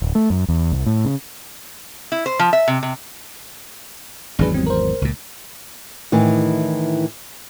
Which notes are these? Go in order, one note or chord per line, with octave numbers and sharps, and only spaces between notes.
D1
A3
F#2
E2
C2
A2
C#3
E4
C5
F3
E5
C3
C3
G#1 E2 F#3 D4 G#4 B4
G3 C4
A#4 C5
C#2 A#2
A2 D#3 E3